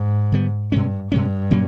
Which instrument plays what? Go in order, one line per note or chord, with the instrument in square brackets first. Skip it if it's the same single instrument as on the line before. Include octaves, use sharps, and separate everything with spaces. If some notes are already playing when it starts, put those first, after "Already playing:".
Already playing: [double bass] G#2
[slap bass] D3 G3 B3
[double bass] G2 [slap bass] B2 G#3 C#4
[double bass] G2 [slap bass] B2 G#3 C#4
[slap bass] A#2 F#3 A#3 C#4